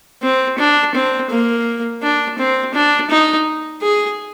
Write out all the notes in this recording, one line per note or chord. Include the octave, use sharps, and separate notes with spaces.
C4
D4
C4
A#3
D4
C4
D4
D#4
G#4